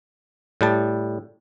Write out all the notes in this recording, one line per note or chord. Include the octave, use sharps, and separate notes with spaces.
A2 G3 A5